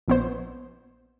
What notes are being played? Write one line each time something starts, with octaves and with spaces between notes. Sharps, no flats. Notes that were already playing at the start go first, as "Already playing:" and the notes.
A#1 B3 C5